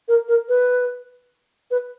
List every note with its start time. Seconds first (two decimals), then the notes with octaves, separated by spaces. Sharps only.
0.08 A#4
0.28 A#4
0.49 B4
1.71 B4